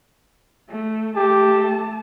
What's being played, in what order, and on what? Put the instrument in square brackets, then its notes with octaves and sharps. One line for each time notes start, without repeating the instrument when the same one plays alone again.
[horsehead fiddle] A3
[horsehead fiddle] A3 A5 [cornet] G4